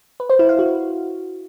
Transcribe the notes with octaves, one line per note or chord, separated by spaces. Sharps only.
B4
C5
E4
F5
F#4